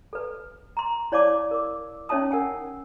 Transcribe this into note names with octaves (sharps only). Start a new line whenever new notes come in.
A4 B4
A#5 C6
E4 C#5 D5 F5 A5 D6
A#4 D6
C#4 D#4 C#5 E5 A5 D#6
A#4 F#5 G#5 A5